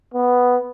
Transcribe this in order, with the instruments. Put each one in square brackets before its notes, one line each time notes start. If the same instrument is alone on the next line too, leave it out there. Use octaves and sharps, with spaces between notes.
[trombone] B3